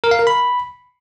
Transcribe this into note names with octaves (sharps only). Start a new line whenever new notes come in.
A#4
F5
A#4
B5